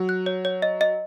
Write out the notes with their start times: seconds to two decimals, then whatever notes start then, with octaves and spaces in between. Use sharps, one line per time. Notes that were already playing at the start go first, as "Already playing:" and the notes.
Already playing: F#3
0.09 F#6
0.26 C#5
0.45 C#5
0.62 D#5
0.81 D#5